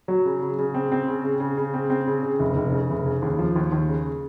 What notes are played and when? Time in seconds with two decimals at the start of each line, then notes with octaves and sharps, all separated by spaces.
0.08 F#3
0.25 C#3
0.41 C#3
0.59 C#3
0.74 C4
0.92 C4
1.08 C#3
1.24 C#3
1.40 C#3
1.57 C#3
1.74 C4
1.90 C4
2.07 C#3
2.23 C#3
2.39 F1
2.56 F1
2.72 C#3
2.90 F1
3.06 C#3
3.22 D#2
3.39 F3
3.56 D#2
3.72 D#2
3.88 C#3